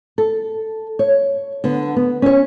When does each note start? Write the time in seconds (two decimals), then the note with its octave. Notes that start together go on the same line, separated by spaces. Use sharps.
0.18 A4
0.99 C#5
1.64 D3 B3
1.96 B3
2.22 C#4 C#5